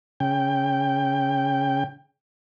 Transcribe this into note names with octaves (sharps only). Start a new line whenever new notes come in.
C#3 G5